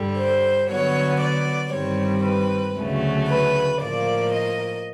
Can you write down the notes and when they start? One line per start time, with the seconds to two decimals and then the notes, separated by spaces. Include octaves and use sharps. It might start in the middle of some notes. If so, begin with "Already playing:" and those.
Already playing: G2 D3 G3
0.17 C5
0.69 D3 F#3 B3 C#5
1.20 D5
1.72 G2 D#3 G3 C4 C#5
2.24 B4
2.76 D2 C#3 F#3 A3
3.28 B4
3.80 A2 F3 A#3 D5
4.32 D#5